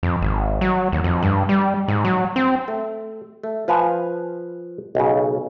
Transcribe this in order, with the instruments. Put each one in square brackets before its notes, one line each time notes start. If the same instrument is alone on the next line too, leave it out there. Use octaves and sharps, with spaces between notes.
[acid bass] F2
G#1
F#3
D#2
F2
G2
G3
G#2
F#3
C4
[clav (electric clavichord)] A3
A3
F3 B4 F5 G#5
B1 C#3